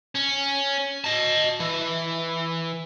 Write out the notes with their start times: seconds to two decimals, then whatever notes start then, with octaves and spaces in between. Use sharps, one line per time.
0.15 C#4
1.04 D#5 A5
1.60 E3